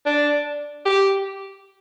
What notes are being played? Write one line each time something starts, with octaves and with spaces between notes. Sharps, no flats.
D4
G4